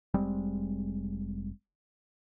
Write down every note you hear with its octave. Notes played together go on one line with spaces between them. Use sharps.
F1 G3 G#3 C4